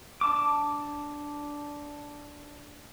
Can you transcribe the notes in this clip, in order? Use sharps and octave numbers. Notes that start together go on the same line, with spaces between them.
D4 A5 D6